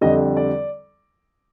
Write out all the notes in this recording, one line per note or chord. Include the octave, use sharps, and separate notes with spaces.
F2 D3 G3 D#5
D5